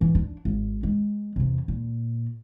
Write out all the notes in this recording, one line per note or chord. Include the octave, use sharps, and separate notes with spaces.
E3
D4
G#1
G#3
E2 C3
A#2